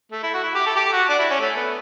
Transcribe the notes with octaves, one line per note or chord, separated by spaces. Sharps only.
A3
E4
F#4
E4
G4
A4
G4
F#4
D4
E4
C#4
A3
B3